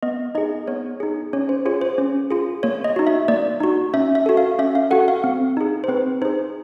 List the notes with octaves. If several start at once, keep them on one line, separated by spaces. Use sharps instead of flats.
B3 D#5
D#4 G#4 D#5
B3 C#5
D#4 G#4
C#4 C#5
C5
F4 G#4 C#5
C5
C#4
F4 G#4
A#3 C#5
D#5
D#4 F#4
E5
A#3 D5
D#4 F#4
C#4 E5
E5
F#4 A4
F5
C#4 E5
F5
F#4 A4 F#5
F5
C4
D#4 G#4
C5
C4 B4
D#4 G#4 C5